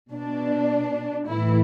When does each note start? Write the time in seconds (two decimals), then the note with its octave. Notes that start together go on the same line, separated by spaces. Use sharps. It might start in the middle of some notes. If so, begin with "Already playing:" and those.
0.14 B2 D4
1.28 A2 E3 E4